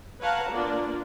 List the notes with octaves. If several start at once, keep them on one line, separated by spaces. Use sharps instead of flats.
B4 C#5 F5 F#5 A5 A#5
A#3 B3 D4 F4 D5